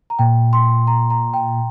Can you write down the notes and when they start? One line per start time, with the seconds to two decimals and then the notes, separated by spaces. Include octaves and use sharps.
0.10 A#5
0.19 A#2 G5
0.53 C6
0.87 A#5
1.10 A#5
1.34 G5